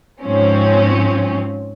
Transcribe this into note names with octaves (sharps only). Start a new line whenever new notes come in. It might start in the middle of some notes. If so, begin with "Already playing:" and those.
G#2 F3 C4 C#4